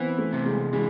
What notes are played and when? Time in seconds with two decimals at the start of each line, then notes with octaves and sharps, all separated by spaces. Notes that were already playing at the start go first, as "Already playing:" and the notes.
Already playing: E3 B3 C4
0.18 A3
0.33 C3
0.46 G#3
0.73 E3 G#3